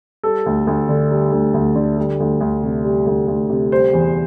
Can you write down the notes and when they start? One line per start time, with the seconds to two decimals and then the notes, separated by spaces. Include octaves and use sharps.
0.23 G3 A4
0.46 D2
0.67 D2
0.89 D3
1.11 G3
1.32 D2
1.54 D2
1.76 D3
1.98 G3
2.20 D2
2.41 D2
2.63 C3
2.85 G3
3.07 D2
3.28 D2
3.50 C3
3.72 G3 C5
3.93 E2